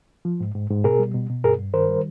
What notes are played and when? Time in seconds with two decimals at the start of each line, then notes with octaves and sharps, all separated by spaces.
0.25 F3
0.40 G#2
0.55 G#2
0.70 G#2
0.84 B2 G#4 A#4
0.99 G3
1.15 B2
1.29 B2
1.44 G2 G#4 A#4
1.59 G2
1.74 D#3 A#4 C5
1.89 G3